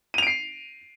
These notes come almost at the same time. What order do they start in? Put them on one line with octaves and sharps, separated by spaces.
D#7 F7 D7 C7